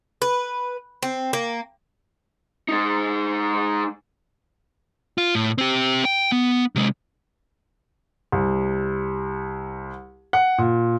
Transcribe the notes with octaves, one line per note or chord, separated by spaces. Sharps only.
B4
C4
A#3
G#3 D#4
F4
A2
C4 G4
G5
B3
C3 G#3
C2
F#5
A#2